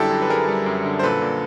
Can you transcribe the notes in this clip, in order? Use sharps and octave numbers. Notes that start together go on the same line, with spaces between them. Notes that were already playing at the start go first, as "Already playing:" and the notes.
Already playing: F#2 D3 G3 D4 E4 G4 A4
F#2
B4
G3 G#4 A#4
G3
F#2
D3
C5
A#2 A4 B4
A#2